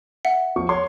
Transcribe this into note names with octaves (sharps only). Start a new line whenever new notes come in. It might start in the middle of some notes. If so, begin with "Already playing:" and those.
E5 F#5
F3 C#6
C#5 C6